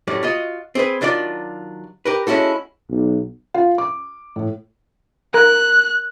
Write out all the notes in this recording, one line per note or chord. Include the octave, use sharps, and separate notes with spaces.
F#2 A2 G3
F4 F#4 D#5
C4 G#4 B4
D#3 F#3 D4 F4 D5
G4 A#4 B4
G#3 C#4 E4 F#4 A4
B1
F4
D6
A2
A#4 F#6